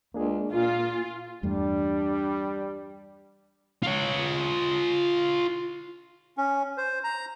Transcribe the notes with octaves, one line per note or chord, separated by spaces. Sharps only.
C#2 A#3 D4 G#4
A#2 A#3 F4
E2 G2 G3 A3 D4
F4 C#5
C#4
C5
A#5